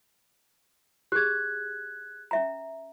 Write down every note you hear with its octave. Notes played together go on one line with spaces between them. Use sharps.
G4 G#4 F#6 G#6
C#4 E5 A#5